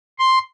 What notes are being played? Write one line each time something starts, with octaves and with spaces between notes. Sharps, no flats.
C6